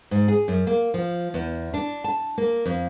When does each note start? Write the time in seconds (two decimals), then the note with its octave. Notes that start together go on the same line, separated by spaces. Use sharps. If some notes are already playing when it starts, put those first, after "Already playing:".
0.11 G#2
0.28 G#4
0.48 F#2
0.67 A#3
0.94 F3
1.34 E2
1.74 D4
2.04 A5
2.38 A#3
2.65 F2